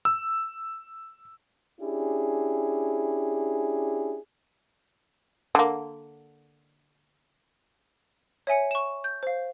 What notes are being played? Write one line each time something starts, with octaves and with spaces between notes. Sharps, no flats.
E6
C#4 D4 E4 G4 G#4
D3 A#3
C#5 E5 G#5 C#7
C#6 E7
G6
C5 F5